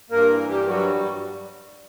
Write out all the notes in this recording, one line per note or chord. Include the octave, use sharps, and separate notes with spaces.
G2 A#3 A#4
E3
G2 G3 G4
F#3 G3 F#4